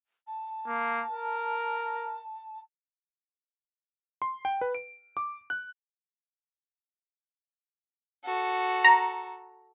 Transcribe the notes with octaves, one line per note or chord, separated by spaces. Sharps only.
A5
A#3
A#4
C6
G5
B4
D7
D6
F#6
F#4 A4
A#5